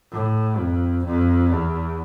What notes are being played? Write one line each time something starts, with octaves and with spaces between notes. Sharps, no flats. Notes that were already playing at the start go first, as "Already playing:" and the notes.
A2
F2
F2
E2